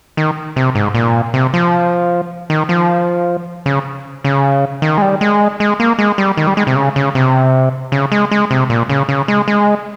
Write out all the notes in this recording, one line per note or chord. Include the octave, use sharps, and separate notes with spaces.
D#3
C3
G#2
A#2
C3
F3
D#3
F3
C#3
C#3
D#3
G#3
G3
G#3
G#3
A#3
G#3
G3
D#3
G3
G#3
C3
C#3
C#3
C3
C#3
G#3
G#3
C3
A#2
C#3
C#3
G#3
G#3